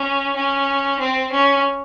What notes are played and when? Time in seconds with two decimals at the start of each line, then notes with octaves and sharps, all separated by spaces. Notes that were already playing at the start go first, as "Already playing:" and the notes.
Already playing: C#4
0.36 C#4
0.99 C4
1.32 C#4